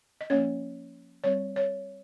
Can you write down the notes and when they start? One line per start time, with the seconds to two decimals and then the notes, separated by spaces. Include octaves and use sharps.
0.21 D#5
0.30 F3 A#3 C#4 C#5
1.24 G3 C4 C#5
1.56 C#5